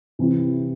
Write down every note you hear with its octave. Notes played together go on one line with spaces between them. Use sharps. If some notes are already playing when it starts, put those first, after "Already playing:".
C3 E3 C4 E4